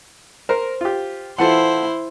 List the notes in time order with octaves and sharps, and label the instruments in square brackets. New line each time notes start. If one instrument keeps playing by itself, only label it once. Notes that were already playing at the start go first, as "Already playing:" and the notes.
[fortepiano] A#4 [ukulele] C5
[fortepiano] F4 G4
[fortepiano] E3 [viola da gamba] E4 C5 [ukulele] F4 A4 F#5